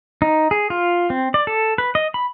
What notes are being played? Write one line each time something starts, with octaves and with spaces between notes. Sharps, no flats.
D#4
G#4
F4
C4
D5
A4
B4
D#5
B5